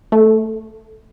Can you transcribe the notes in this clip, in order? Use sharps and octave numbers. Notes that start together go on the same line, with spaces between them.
A3